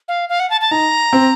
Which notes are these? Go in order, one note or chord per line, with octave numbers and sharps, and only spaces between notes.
F5
F5
F#5
A5
A5
D#4 A#5
C4